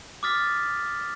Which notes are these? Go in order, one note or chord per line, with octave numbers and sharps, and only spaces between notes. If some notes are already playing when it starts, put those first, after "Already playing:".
D6 D#6 F6 A6 B6